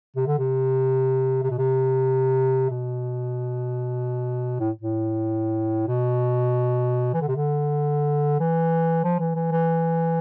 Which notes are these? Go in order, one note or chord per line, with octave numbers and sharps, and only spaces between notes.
C3
D3
C3
C3
B2
C3
B2
A2
A2
B2
E3
D3
C3
D3
E3
F3
E3
E3
E3